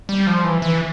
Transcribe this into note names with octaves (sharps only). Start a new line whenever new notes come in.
G3
F3
E3
E3